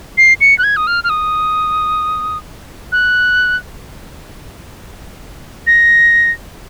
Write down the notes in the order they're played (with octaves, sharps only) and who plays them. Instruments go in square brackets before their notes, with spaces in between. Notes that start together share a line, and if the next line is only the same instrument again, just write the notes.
[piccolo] C7
C#7
F#6
G#6
D#6
F6
F6
D#6
F#6
A#6